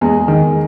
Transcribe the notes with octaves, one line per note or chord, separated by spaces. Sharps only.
E2 G#3 G#4
D#3